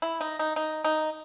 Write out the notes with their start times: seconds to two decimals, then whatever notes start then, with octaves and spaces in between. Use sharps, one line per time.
0.02 E4
0.21 D#4
0.39 D#4
0.56 D#4
0.85 D#4